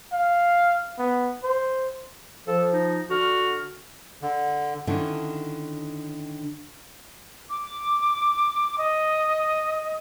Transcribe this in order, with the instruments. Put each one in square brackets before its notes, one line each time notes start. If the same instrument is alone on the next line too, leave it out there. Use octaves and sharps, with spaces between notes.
[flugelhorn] F5
B3
C5
[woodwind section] F3 [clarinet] A4
[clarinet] D#4
[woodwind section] D3 F6 [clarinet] F#4
[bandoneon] D3
[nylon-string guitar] D3 D#3 C#4 D4 E4
[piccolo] D6
D#5